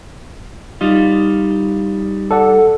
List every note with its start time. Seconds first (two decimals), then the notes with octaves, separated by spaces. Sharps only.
0.81 G3 D#4 F4
2.31 A4 D5 F#5